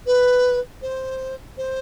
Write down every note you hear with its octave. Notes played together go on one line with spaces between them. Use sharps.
B4
C5
C5